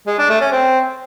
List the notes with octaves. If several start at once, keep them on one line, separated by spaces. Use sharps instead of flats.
G#3
D4
A3
C#4
C4